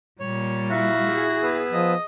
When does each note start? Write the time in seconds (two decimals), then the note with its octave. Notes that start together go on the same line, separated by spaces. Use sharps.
0.20 A#2 G3 C#5
0.71 E4 F#4 E5 F5
1.09 G#4
1.43 B3 B4 E6
1.73 F3 D#5